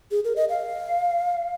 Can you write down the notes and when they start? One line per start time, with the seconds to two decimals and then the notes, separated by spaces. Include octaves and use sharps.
0.11 G#4
0.25 A#4
0.36 D#5
0.49 F5